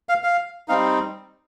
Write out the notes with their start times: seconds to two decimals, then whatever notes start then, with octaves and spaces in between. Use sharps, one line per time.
0.09 F5
0.23 F5
0.68 G3 C4 D#4 F5